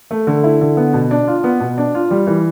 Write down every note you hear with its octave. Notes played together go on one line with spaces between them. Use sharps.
A3
D3
E4
D3
B3
B2
D4
F4
B3
B2
D4
F4
G3
E3